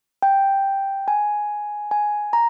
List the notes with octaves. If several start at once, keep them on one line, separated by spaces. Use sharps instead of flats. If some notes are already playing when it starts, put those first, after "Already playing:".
G5
G#5
G#5
A#5